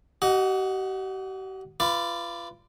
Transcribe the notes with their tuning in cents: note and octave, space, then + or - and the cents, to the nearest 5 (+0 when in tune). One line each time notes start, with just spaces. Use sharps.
G4 -45 D#5 +0 F#5 +0
F4 -30 B4 +0 D5 +0